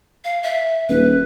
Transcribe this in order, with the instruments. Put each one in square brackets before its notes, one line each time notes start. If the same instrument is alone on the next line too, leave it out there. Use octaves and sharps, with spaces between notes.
[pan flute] F5
E5
[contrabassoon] D#1 [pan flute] B4